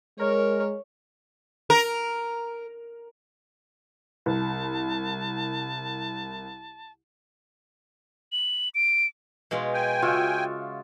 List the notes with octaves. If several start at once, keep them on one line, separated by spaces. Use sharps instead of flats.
G#3 A#4 C#5
A#4
C2 A5
F#7
D7
B2 G#3 F4
G5 G#5
C#3 F4 F#4 E5